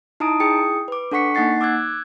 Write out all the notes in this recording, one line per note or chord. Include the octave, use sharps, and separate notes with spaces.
D#4 E4 A5 A#5 D#6 D7
E4 G#4 G5 D#6 C#7
B4 D6
D4 A4 F#5 C#6 B6 C#7
A#3 D#4 F#5 A6 C7
D6 E6 F#6 G#6